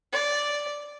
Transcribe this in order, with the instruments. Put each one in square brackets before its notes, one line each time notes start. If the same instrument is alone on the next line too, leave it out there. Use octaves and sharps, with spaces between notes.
[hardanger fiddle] D5